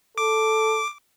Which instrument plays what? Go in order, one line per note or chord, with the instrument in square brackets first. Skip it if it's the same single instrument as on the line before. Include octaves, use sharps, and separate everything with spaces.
[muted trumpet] A4 [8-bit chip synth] D6